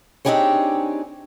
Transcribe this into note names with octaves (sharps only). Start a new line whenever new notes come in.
C4 D4 D#4 G4 G#4 C#5